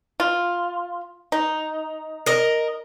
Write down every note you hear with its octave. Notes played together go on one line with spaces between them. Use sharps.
F4
D#4
A#4 D#5